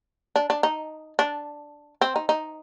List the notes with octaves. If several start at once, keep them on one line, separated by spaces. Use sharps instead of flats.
D4
D4
D#4
D4
C4
D#4
D#4